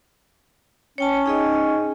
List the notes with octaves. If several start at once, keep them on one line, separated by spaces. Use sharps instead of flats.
C#4 C#5 G5 A5
D#4 G#4 D#5